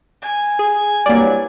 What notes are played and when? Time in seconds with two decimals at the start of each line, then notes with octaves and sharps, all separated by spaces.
0.22 G#5
0.59 G#4
1.06 C2 G2 F#3 A#3 D5